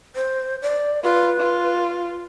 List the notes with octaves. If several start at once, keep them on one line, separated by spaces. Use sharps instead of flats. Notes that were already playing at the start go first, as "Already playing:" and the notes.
C5
D5
F4 B4
F4